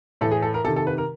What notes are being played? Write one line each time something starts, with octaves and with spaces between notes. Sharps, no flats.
A2 E3 A4
G#4
A4
A#4
C3 D#3 A4
A4
B4
A#4